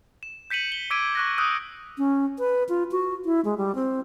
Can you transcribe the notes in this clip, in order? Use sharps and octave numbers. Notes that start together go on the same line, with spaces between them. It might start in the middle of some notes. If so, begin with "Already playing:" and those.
E7
G6 B6 C#7 D#7 F#7
G7
D6 E6 G#6 B6 D7 D#7
C#6 F#6 A#6
D#6 E6 F#6 G6
C#4
B4
F4
F#4
E4
G#3
G3
C4